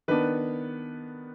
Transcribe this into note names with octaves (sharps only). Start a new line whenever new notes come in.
D#3 B3 D4 B4